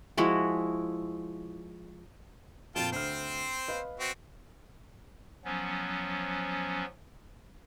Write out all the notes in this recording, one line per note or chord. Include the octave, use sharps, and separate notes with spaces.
F3 G#3 E4 F#4
F2 A#2 F4 G5 A5
D2 C4 C5 F6
B4 D#5 F5
C4 F#4
F3 F#3 B3 C#4